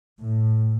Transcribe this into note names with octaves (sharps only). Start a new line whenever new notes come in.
A2